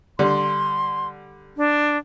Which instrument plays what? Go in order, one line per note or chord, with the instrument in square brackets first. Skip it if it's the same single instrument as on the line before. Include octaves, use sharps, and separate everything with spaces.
[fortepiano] D3 G3 [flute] C6
[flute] D4